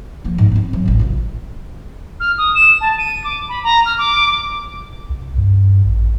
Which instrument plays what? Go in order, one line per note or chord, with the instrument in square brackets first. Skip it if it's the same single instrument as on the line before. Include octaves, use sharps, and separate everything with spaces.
[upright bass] F3 A#3
G#2
B3 C4
E2 F#3
A1 F2
C2 F4
[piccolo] F6
D#6
E7
A5
D#7
D6
B5
A#5
F6
D6
[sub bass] C2
G2
A1